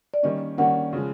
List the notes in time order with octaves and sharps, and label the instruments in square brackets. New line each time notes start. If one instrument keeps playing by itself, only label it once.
[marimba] D5
[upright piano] D#3 G3 A#3 C#4 [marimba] D#5
[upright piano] D#3 G3 A#3 C#4 [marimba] F#5
[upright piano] C#3 F3 G#3